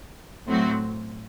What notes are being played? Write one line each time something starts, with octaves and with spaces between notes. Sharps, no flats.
A2 F#3 C4 F#4